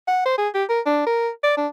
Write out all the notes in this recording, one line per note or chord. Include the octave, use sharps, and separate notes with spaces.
F#5
C5
G#4
G4
A#4
D4
A#4
D5
D4